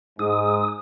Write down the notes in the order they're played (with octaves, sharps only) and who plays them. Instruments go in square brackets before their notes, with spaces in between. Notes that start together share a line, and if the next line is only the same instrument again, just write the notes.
[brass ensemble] G#2 [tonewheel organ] D#6